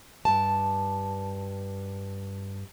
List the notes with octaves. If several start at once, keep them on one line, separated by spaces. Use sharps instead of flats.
G2 A5